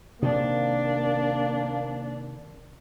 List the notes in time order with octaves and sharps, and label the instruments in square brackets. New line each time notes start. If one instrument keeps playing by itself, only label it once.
[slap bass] C3 D#3 C4 [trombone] A#3 [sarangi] D4